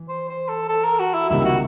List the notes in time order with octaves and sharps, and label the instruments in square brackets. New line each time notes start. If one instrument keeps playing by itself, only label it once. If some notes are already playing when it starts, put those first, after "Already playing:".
Already playing: [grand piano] E3
[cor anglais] C5
C5
A4
A4
A#4
F#4
E4
[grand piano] C#2 C3 D#3 G3 A#3 [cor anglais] E4
[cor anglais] F#4